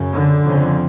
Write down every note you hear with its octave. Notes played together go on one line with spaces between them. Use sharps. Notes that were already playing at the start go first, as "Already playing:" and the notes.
Already playing: F#2 C#3
D3
F2 C#3